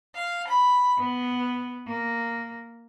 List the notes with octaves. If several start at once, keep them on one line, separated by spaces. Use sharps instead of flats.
F5
B5
B3
A#3